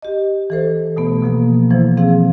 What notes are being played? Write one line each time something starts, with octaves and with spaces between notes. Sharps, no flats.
G4 D#5
E3 A4 C5
B2 A3 B3
B2 F3 A#3
E3 F3 E4 C5
C4 E4 G#4 F5